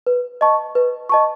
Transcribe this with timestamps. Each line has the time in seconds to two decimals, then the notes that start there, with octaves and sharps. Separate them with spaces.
0.07 B4
0.41 D#5 A5 C#6
0.75 B4
1.09 D#5 A5 C#6